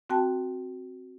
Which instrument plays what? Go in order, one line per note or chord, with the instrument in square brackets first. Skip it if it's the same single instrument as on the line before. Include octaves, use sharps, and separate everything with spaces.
[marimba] C4 F#4 G5 A5